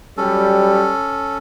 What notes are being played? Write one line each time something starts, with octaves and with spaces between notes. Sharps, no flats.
F#3 G3 C#4 A4